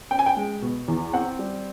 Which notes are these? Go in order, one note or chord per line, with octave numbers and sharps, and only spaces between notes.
C#4 G5
G#5
G5
G#3
B2
E2
C4 F#5
G3